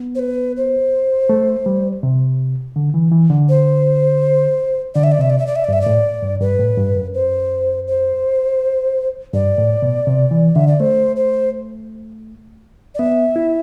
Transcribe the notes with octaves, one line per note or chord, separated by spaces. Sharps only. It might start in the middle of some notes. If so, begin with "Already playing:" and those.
Already playing: B3
C5
B4
C5
A3
G3
C3
D3
E3
E3
D3
C5
D3 D5
E5
D5
C3 E5
D5
E5
D5
E5
D5
G2 E5
D5
A2
G2
G2 B4
A2
G2
F#2
C5
C5
G2 D5
A2
B2
C3
E3
D3 E5
D5
A3 C5
C5
D5
B3 E5
E4